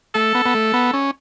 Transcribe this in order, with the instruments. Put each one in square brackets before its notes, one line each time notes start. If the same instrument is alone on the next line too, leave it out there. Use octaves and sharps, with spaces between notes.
[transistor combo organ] A3 [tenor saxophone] A4
[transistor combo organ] B3
B3
A3
B3
C#4